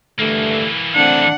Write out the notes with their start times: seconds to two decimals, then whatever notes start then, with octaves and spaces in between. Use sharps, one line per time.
0.19 G2 D3 E3 A3 A#3
0.95 D3 A3 C4 D4 F#5